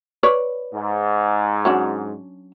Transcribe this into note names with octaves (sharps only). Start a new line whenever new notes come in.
B4 C#5 D5
G#2
F#3 C#4 D4